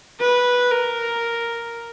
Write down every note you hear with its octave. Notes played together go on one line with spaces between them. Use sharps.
B4
A#4